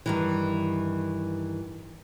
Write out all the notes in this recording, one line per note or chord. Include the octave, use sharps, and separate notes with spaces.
G2 D#3 E3